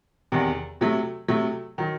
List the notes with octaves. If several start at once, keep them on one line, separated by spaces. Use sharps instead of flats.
E2 C3 D#3
C3 F#3 A3
C3 F#3 A3
D#3 F#3